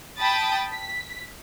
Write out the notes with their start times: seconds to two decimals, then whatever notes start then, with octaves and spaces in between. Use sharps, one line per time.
0.18 G5 A5 B5 D#6 A6
0.72 B6